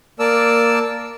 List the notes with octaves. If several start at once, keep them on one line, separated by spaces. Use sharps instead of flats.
A#3 A#4 D5 A5 E6